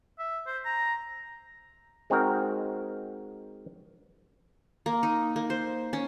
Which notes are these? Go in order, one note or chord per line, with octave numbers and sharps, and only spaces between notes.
E5
C5
A#5
G#3 C4 D#4 F#4 A#4
A#3
D#4
A#3
C5
C#4